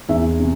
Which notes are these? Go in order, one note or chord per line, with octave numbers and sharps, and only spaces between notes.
E2 E5
C3